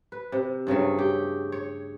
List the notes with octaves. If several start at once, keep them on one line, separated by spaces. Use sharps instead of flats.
B4
C3
G2 C#3 F#3 A3
G4
C#5